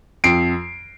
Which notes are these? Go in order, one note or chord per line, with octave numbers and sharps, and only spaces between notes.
F2 C7 D7